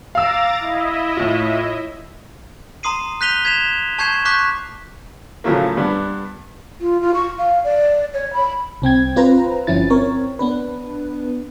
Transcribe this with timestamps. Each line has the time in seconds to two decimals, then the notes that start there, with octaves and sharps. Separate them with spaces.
0.15 F5 A#5 D6 E6 A6
0.60 E4 D#5 E5
1.17 A2 F4
2.83 A#5 C6 D#6 C7 D#7
3.21 F#6 G6 B6 D#7 F7 G7
3.45 G#6 B6 E7 F7
3.99 A5 C#6 G6 G#6 C7 E7
4.25 C#6 D6 F#6 G6 B6
5.44 A2 C#3 F3 F#3 A3 A#3
5.77 G2 B3 D4
6.80 F4
7.01 F4
7.14 C#6
7.38 F5
7.64 D5
8.14 C#5
8.33 B5
8.82 C2 C4 G5 G#6
9.16 C4 F4 B4 C5 A#5
9.67 G1 F3 C#4 E4 A6
9.90 C4 A#4 C#5
10.39 B3 D4 B4